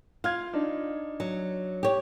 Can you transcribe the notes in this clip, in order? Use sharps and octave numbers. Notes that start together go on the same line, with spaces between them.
F4 F5 F6 G#6
D4 D#4
F#3
G4 C#5